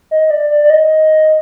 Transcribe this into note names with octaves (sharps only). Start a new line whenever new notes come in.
D#5
D5
D5
D5
D#5